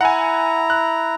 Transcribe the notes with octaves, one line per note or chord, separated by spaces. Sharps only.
E4 F#5 G#5 A#5
F#6